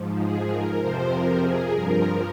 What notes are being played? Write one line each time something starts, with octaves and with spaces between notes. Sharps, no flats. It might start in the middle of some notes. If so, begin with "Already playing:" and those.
Already playing: G#2 F3
G#4
A#4
F2 C3 F3 C5
A#4
G#4
G2 F3 A#4